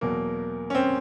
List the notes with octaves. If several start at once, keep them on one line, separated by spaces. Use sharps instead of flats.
E2 B2 F#3 A#3
C#4
C4